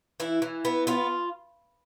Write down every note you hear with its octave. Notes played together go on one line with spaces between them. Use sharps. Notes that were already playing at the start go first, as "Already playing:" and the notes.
E3 E4
E3
B3
B3 F4